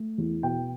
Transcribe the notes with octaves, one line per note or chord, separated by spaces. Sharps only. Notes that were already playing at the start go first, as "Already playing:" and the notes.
Already playing: A3
E2
B2 G5